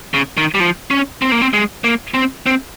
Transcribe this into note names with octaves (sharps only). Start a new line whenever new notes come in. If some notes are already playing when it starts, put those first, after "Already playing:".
C#3
D#3
G3
F3
C#4
C4
A#3
C4
G#3
A#3
C4
C4